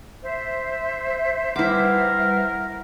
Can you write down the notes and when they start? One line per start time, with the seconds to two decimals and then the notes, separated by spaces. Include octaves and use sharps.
0.22 C5 E5
1.56 G3 E4 A#4 B4 F#5 D6